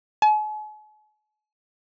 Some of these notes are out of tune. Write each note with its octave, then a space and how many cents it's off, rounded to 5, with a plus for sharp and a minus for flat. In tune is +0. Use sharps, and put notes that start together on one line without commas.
G#5 +45